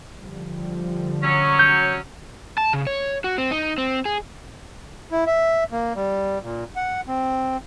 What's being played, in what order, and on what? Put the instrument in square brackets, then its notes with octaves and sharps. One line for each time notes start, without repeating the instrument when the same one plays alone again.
[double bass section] D3 F3 G3
[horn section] F#3 C#4
[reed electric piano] G6
[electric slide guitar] A5
C#3
C#5
F#4
C4
D#4
C4
G#4
[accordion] E4
E5
A#3
G3
A#2
F#5
C4